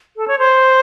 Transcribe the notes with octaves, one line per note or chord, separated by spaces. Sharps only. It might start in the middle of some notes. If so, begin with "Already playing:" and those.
A4
C#5
C5